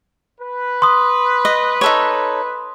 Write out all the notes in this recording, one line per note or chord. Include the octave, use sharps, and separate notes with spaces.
B4
C6 D#6
D#5
D#4 A4 C#5